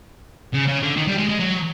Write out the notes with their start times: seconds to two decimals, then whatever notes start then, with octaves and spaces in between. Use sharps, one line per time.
0.54 C#3
0.68 C#3
0.82 D3
0.97 D#3
1.07 G3
1.18 G#3
1.29 G#3
1.39 F#3